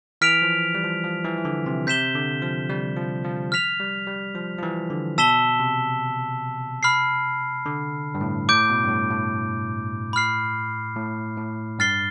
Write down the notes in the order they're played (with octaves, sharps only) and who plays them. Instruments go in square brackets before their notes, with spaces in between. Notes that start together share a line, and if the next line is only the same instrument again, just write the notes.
[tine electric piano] E3 [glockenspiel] F6 B6 D7 F7
[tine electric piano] F3
G3
F3
F3
E3
E3
D3
C3
[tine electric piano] C3 [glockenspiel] G6 B6 E7 G7
[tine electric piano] D3
F3
G3
F3
F3
[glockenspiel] F6 B6 F7
[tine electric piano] G3
G3
F3
F3
E3
D3
[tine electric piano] B2 [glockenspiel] A5 E6 B6 E7 G7
[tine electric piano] C3
[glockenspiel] B5 F6 C7
[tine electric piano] D3
G2
A2
[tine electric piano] A2 [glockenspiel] D6 G6 D7
[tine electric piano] B2
G2
A2
A2
[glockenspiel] B5 F6 C7
[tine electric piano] A2
A2
[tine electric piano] G2 [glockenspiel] F6 A6 C7 G7